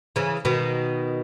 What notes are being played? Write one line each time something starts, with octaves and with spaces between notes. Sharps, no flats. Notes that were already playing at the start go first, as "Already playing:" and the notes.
C#3 E3
B2 D#3